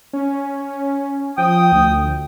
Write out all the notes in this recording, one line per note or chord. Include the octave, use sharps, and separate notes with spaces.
C#4
F3 G5 D#6
D2